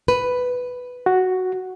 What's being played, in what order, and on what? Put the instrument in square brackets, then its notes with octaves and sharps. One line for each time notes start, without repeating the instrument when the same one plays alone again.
[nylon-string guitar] B4
[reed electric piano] F#4